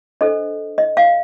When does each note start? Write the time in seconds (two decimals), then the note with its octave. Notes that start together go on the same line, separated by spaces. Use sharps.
0.21 D4 A4 C5 D#5
0.78 D#5
0.97 F5